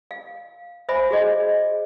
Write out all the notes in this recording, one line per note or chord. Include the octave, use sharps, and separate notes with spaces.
F5
C5 E5 G#5 B5
F#4 G#4 D#5